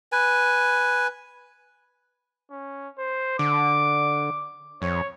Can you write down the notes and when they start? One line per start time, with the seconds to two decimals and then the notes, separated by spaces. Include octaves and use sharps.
0.12 B4 G#5
2.51 C#4
2.98 C5
3.39 D3 D6
4.82 F2 C#5